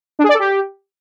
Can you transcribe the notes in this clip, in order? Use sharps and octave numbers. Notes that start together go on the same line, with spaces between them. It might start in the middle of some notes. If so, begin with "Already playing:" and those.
D4
G#4
D5
A4
G4